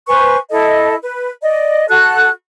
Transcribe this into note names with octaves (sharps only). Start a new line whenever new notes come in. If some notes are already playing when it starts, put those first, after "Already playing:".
B4 C5 G#5 C#6
E4 A4 D#5
B4
D5 D#5
F#4 A4 F#6